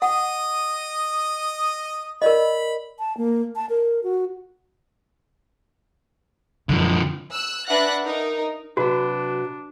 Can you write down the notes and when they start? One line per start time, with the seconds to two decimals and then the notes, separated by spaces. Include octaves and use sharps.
0.02 D#5 F#5 D#6
2.22 A#4 D5 D#5 B5
2.99 A5
3.17 A#3
3.56 A5
3.70 A#4
4.04 F#4
6.69 F#2 D3 F3
7.31 E6 F#6
7.68 D4 B4 E5 F#5 F#6 A#6
8.03 D#4 A#4
8.77 C3 F#3 D4 F#4 B4